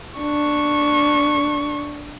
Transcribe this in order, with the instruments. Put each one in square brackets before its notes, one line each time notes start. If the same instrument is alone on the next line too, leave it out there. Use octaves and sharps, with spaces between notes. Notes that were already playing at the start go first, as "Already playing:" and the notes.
[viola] D4 C#6